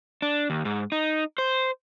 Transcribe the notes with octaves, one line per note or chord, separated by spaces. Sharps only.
D4
D#2
G#2
D#4
C5